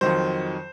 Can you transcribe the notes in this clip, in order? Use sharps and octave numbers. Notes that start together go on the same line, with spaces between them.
F2 D#3 F#3 C5